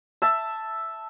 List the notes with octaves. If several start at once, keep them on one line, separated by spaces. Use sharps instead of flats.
E5 A5 E6